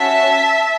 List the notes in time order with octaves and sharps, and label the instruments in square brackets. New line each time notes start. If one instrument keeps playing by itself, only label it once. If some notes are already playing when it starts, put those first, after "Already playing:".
Already playing: [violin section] C#4 F#4 E5 A5